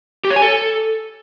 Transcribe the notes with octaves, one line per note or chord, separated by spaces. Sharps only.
G4
C#5
G#5
A4